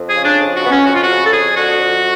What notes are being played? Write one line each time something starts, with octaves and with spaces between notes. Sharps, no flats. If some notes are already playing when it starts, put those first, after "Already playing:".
Already playing: F2
G#4
C#3
D4
F2
F#4
C#3 B3
C#4
F2 F#4
F4
F#4
C#3
A4
F2 G#4
D3 F#4
F2